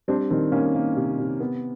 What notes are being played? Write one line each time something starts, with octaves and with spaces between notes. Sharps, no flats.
G3 C4 D4
D#3 C4
A#3 C#4
A#3
C3
C3
B3